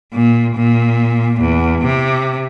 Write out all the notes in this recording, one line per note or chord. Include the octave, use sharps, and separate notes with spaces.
A#2
A#2
E2
C3